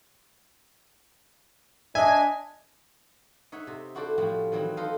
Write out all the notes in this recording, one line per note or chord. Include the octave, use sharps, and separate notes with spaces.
D4 D#5 E5 G#5
D#4 C#5 E5 F#5
C3
E4 F#4 A4 C5 D5
A2 F3 G3 C4 F#4
D#3 E3 F#3 C4 E4
D#4 F4 A4 C5 D#5 F5